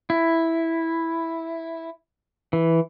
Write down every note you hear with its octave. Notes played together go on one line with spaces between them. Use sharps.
E4
E3